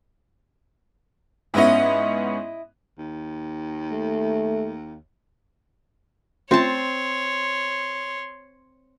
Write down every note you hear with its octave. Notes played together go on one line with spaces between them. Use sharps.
G#2 B3 C#4 E4 D#5
D#2
A3
A3 C4 C#4 F4 C#5 A5 C6